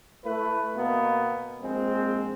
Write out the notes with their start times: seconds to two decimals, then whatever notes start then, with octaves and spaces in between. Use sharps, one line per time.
0.23 A3 E4 B4
0.75 B2 A#3 B3
1.62 A#1 G#3 C4